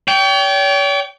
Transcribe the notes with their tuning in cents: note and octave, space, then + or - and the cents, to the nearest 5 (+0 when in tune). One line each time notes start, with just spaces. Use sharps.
C#5 +45 G5 -10